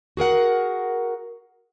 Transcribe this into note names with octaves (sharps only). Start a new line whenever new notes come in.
F#4 G#4 A#4 F#5